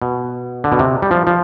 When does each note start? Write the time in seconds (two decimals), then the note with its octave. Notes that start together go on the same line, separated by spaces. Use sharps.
0.02 B2
0.64 D3
0.72 B2
0.79 C3
1.02 G3
1.11 F3
1.27 F3